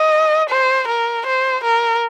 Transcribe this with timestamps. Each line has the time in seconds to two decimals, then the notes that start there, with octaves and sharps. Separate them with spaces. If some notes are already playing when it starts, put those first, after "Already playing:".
Already playing: D#5
0.50 C5
0.88 A#4
1.27 C5
1.64 A#4